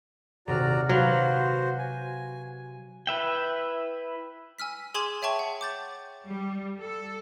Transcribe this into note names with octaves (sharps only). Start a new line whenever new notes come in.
D#1 C3 F#4 D5 A#5 F6
F#3 F#4 B4 C5 F5 D6
G#5
E4 B4 E5 G5
G#5 E6 F6 B6
G#4 G#5 C6 D6 G#6 E7
C#5 E5 G5 A5 C#6
F#5
D6 G6 A6
G3
A4